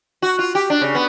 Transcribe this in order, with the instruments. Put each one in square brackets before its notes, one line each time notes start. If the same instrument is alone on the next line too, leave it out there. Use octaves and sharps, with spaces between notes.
[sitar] F#4
F4
G4
D4
C#3
B3